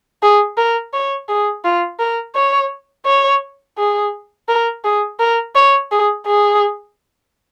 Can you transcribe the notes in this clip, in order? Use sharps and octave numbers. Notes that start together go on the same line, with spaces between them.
G#4
A#4
C#5
G#4
F4
A#4
C#5
C#5
G#4
A#4
G#4
A#4
C#5
G#4
G#4